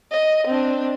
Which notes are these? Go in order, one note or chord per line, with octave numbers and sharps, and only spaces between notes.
D#5
C4 D4